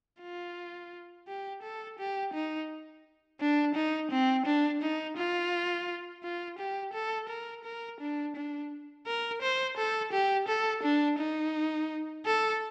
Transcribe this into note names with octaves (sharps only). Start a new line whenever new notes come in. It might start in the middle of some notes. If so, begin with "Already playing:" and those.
F4
G4
A4
G4
D#4
D4
D#4
C4
D4
D#4
F4
F4
G4
A4
A#4
A#4
D4
D4
A#4
C5
A4
G4
A4
D4
D#4
A4